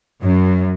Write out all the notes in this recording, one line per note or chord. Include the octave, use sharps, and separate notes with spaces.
F#2